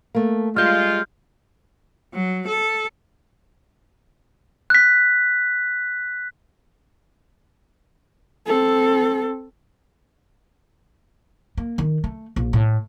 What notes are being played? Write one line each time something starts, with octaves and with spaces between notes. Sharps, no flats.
A3 A#3
G3 G#3 F4 F6 G6
F#3
A4
F#6 B6
C4 A4
A#3
D#3
A3
A#1
A2